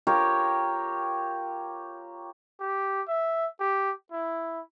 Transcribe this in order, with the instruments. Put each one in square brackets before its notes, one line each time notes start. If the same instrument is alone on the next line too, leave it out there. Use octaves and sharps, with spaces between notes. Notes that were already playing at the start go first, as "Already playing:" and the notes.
[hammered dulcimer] F4 G4 A#4 C#5
[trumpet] G4
E5
G4
E4